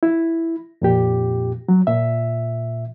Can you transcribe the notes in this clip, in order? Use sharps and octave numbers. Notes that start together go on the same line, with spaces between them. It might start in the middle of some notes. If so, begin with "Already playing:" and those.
E4
F2 A#2 G4
F#3
A#2 E5